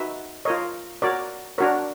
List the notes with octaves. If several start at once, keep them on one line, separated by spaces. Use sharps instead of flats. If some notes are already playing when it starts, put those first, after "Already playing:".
Already playing: D#4 F#4 B4 E5
F4 A#4 C#5 D#5
F#4 A#4 C#5 D5
D4 F#4 A#4 C#5